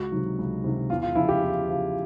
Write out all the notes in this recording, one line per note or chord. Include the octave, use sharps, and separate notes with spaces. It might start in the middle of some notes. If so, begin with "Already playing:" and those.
Already playing: C#2 F#4
C3 D#3 F#3
C#2
C3 D#3 F#3
E2 F4
F4
C#3 F3 E4
G4
E2
C#3 F3